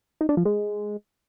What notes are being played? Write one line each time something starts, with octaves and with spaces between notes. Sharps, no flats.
D#4
D4
F3
G#3